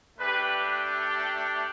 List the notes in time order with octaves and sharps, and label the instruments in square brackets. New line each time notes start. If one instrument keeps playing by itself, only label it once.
[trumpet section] A3 D4 G4 B4